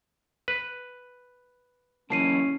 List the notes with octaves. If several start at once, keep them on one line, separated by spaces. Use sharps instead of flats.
B4
E3 F#3 A#3 C#4 A5 C7 D#7